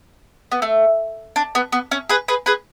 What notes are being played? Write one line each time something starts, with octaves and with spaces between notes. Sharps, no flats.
B3
A3
D4
B3
B3
C#4
G#4 B4
G#4 B4
G#4 B4